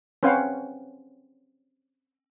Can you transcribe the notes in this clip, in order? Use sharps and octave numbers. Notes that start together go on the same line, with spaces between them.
C4 C#4 B4 C5 F5 F#5